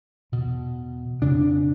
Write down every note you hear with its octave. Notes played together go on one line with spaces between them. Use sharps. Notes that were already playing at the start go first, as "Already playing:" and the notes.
E2 B2
F2 C#3 D4